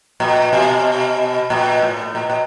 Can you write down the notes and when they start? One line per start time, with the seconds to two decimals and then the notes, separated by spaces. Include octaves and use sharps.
0.20 A#2
0.53 B2
1.50 A#2
1.82 A2
2.15 A#2
2.30 A#2